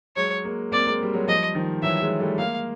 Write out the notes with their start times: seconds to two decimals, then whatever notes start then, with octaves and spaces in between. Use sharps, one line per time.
0.16 F#3 G#3 C#5
0.44 G#3 A#3
0.72 A#3 C4 D5
0.86 G#3 A#3
1.03 G3
1.13 F#3 G#3
1.27 F3 G3 D#5
1.55 D#3 F3
1.82 E3 F#3 E5
2.01 F#3 G#3
2.20 G3 A3
2.38 G#3 A#3 F5